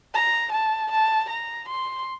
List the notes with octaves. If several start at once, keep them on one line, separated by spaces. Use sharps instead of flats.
A#5
A5
A5
A#5
C6